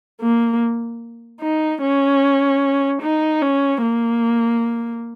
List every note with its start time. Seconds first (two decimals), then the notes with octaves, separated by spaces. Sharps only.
0.21 A#3
1.41 D#4
1.82 C#4
3.02 D#4
3.42 C#4
3.82 A#3